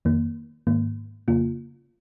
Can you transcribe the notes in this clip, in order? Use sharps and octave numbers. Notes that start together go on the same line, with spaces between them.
F2 D#3 A#3
G#2 D#3 A#3
F2 C#3 A#3 F4